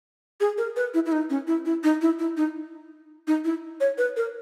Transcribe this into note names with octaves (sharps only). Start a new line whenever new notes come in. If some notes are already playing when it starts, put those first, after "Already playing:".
G#4
A#4
B4
E4
E4
D#4
C#4
E4
E4
D#4
E4
E4
D#4
D#4
E4
C#5
B4
A#4